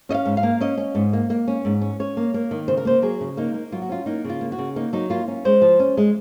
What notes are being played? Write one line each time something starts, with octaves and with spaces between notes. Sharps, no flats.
C#4 D#5
F5
G#2
F5
A#3
C#4 D#5
C#4
G#2
A#3
A#3
C#4
G#2
C#4
C#4 C#5
A#3
A#3
D#3
C#3 C5
A#4
A#3 C5
F#3 G#4
C#3
A#3 D#4
A#3
F#3 F4
F#4
C#4 F4
A#3 D#4
C#3 F4
A#3
F#4
C#3
A#3 D#4
F#3 D#4
A#3 F4
C#4
G#3 C5
F3
C#4
G#3